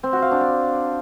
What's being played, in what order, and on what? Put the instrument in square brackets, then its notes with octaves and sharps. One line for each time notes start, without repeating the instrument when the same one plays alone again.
[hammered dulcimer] C4
F#4
F5
D4
D5